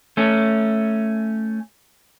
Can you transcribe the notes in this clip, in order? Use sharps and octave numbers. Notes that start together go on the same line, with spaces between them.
A3 C#4